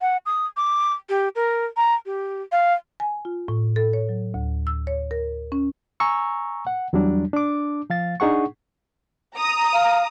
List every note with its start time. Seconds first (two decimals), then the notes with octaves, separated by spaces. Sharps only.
0.01 F#5
0.26 D#6
0.57 D6
1.09 G4
1.36 A#4
1.77 A#5
2.06 G4
2.52 F5
3.00 G#5
3.25 F4
3.48 A2
3.76 A4
3.93 C#5
4.09 F#3
4.34 D2
4.67 E6
4.87 C#5
5.11 A#4
5.52 C#4
6.00 G#5 A#5 C#6 E6
6.67 F#5
6.93 E2 F#3 G3 D4
7.33 D4 D6
7.90 F3 F5 A6
8.20 D4 D#4 G#4 F#5 C#6
9.36 A#5 D#6
9.74 F5